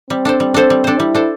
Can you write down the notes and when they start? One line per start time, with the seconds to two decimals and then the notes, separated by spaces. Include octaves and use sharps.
0.10 G3 C4
0.25 D4 A4 C5
0.40 G3
0.54 D4 A4 C5
0.70 G3
0.84 D4 A4 C5
0.99 G3 E4
1.15 D4 A4 C5